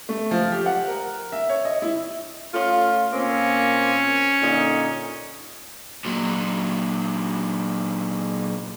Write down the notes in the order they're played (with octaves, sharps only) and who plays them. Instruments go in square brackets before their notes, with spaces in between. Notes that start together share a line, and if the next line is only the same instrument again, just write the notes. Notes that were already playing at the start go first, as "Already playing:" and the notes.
[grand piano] A3
F3
G4
F#5
A#4
E5
C#5
D#5
E4
[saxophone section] A3 C#4 F4
[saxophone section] A#2 A#3 C4 [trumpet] C#4
[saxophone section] A#2 D3 D#4
[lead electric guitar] A#2 F#3